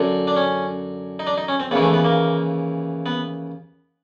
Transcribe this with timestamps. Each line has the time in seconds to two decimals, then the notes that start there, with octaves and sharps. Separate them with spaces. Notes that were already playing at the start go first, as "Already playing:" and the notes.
Already playing: F#2 D3
0.27 D4
0.36 C#4
1.19 D#4
1.27 D4
1.38 D#4
1.48 C#4
1.60 C4
1.71 D#2 C#3 E3 B3
1.82 A3
1.94 B3
2.04 A#3
3.06 B3